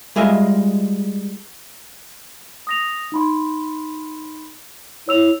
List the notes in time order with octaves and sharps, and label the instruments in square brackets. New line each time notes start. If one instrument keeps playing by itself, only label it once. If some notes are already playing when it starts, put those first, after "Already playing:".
[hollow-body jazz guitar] G3 G#3 F4 D#5 E5
[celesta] D#6 A#6 F7
D#4 B5 C6
[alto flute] E4 [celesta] C#5 E6 F7